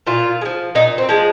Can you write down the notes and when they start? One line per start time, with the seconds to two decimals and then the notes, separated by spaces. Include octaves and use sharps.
0.07 A#2 F4
0.41 G#3
0.45 F3
0.75 A#2 D#4
0.98 C4
1.09 F3 G#3